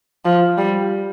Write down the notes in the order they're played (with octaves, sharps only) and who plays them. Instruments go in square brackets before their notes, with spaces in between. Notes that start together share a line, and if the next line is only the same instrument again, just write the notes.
[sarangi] F3
G3